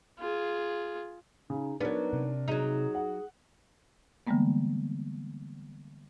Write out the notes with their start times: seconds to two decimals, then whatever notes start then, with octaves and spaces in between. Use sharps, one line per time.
0.19 F4 G#4
1.50 C#3 D#4
1.80 F#3 B3 D4 D#4 A#4 C#5
2.13 C3
2.48 F#3 D#4 G#4
2.95 F#5
4.27 D3 E3 G3 G#3 A#3 B3